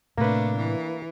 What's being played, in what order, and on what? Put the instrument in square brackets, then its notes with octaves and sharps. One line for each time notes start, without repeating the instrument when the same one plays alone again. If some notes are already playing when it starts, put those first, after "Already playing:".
[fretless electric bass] A2 C3 [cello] A3 D4 [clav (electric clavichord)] A#3 B4
[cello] E3